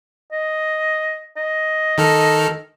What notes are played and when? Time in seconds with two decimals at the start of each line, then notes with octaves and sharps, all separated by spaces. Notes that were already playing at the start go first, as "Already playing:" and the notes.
0.32 D#5
1.37 D#5
1.98 D#3 A4 F6